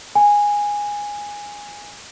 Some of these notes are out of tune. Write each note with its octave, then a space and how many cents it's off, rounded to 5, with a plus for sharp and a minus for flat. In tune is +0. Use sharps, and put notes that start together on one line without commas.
G#5 -10